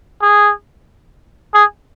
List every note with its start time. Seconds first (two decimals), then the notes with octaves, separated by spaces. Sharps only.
0.22 G#4
1.54 G#4